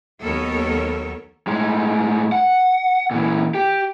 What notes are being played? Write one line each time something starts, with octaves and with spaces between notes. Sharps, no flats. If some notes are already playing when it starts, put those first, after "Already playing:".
D#2 F#3 B3 A4 A#4 C#5
A2 G#3
F#5
A#2 E3
G4